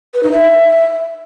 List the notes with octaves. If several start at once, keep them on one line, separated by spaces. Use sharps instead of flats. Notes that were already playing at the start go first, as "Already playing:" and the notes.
B4
D#4
E5